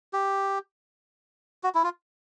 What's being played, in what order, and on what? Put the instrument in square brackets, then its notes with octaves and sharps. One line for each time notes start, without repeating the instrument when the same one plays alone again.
[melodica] G4
F#4
E4
F4